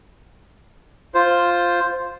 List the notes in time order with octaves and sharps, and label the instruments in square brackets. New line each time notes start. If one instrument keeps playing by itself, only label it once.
[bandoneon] F4 C5